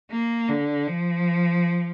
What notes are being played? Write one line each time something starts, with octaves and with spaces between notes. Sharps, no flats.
A#3
D3
F3